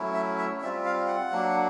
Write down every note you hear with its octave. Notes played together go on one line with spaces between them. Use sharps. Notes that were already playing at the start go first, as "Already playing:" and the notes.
Already playing: F#3 A3 C#4 E4
E5
E5
G3 C4 F4 E5
F5
F#5
F#3 A#3 D4